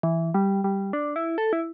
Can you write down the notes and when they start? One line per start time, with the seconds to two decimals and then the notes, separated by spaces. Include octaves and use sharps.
0.03 E3
0.34 G3
0.64 G3
0.93 D4
1.16 E4
1.38 A4
1.53 E4